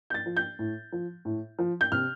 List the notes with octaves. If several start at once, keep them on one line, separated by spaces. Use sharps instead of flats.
G6
A6
F3
G6
A2
F3
A2
F3
G6
C3 F6